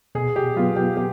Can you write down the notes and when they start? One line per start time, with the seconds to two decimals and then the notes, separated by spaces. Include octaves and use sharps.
0.15 B2 G#4
0.36 G4
0.56 F#3 B3 F4
0.76 G4
0.97 G4